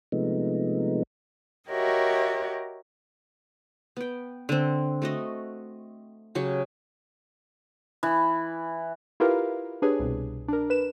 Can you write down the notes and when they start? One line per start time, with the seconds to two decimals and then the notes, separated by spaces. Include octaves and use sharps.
0.12 C3 F3 G#3 A3 B3 D#4
1.70 F#4 G4 A#4 C#5 D#5 E5
3.97 B3 G5
4.49 D3 C4
5.02 A3 F#4 D#5
6.35 C#3 F#3 G4 C#6
8.03 E3
9.20 E4 F4 G4 A#4 B4 F5
9.82 D4 G4 G#4 B4 C#5
10.00 C2 B2
10.48 D4 A#4
10.70 B4 E7